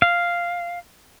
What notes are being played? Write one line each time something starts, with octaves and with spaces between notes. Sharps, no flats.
F5